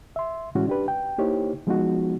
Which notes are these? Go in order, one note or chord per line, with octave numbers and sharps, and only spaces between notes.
E5 C6
A2 E3 G#3 C#4 E4 F#4
D4 G4 B4
G5
A#3 D#4 E4 G4 C5 C#5
F3 G#3 B3 D#4 F#4